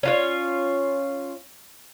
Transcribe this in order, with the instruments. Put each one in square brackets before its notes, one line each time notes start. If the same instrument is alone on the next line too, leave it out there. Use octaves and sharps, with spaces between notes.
[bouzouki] C#4 F4 C#5